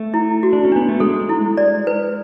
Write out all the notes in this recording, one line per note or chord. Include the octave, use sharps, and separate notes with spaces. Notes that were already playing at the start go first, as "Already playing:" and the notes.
Already playing: A3
E4
F#4
D4
C#4
B3 D4
A3
G#3 A4
E4
D5
B4